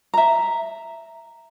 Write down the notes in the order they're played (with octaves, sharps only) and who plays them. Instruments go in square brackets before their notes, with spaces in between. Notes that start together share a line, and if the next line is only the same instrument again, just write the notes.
[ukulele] E5 A#5